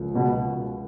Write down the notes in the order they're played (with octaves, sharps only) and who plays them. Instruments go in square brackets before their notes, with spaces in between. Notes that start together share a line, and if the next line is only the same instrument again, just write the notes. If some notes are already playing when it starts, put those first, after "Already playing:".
Already playing: [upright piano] C#2 F3
[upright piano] C#2 [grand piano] B2